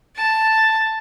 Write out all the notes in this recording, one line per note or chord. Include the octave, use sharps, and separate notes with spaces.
A5